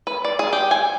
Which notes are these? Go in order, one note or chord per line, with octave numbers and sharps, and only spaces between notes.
B4
D5
G#4
G4
G#5